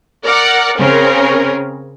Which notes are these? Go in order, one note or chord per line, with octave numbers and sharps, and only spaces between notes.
A#4 D5 F#5
C#3 C4 C#4 A#4